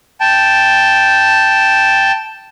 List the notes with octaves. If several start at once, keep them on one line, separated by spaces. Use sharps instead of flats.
G5 A5